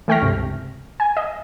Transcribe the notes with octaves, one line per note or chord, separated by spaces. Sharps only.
E3 A3 G5 C#6 F6 A#6
C#2 G2 C3
G#5
D#5